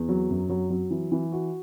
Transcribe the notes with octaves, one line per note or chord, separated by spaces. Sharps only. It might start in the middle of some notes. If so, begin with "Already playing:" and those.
Already playing: E2
F#3
F#2
F#3
F#3
E3
E3
F#4